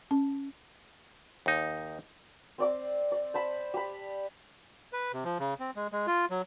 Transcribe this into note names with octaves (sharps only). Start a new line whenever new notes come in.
C#4
D#2 D#4
C4 D5 D6
D5
C5 A5 B5
G4 B5
B4
C3
F3
C#3
C4
G#3
G#3
F4
F#3